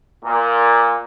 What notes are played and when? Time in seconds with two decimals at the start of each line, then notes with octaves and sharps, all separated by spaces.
0.24 A#2